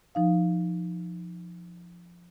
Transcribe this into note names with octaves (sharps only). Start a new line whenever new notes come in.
F3 D#4 F5